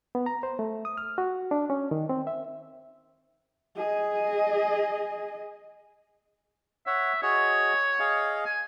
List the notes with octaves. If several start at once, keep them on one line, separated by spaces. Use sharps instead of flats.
B3
A#5
C5
A3
D#6
F6
F#4
D4
C#4
D#3
C4
E5
G#4 D#5
C#5 E5 F#5
F#4 G#4 C#5 D#5
G#4 D#5 F5
G#5